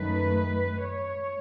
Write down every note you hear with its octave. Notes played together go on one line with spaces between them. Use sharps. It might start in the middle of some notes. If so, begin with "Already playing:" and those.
Already playing: F#2 D#3 A3 B4
C#5